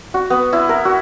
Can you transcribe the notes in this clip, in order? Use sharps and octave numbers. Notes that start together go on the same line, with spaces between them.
F#4
B3
E4
A#4
F#4